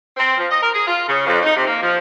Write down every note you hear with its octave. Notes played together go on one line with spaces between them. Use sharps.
C4
F3
D#5
A#4
G#4
F4
C#3
F2
D#4
C3
A#3
F3